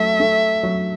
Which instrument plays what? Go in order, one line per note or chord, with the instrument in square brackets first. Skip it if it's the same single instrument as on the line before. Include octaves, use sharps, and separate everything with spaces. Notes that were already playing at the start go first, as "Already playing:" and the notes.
Already playing: [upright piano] F#3 A3 [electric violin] E5
[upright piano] A3
F#3